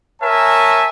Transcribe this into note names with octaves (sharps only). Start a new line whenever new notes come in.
A#4 C#5 E5 G#5 A5